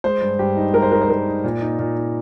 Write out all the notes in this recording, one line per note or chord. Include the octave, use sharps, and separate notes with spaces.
G#3 C5
G2
G2 G4
D#4
G#3 A#4
C5
D#4 A#4
C5
G2 A#4
D#4
A#2
D#4
A#2
D#4